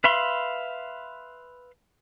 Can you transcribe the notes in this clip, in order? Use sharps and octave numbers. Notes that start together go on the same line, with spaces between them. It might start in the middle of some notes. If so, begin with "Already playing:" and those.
B4 E5 F5 B5 C6